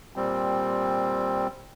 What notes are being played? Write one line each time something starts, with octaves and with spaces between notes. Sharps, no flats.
A#2 G3 C4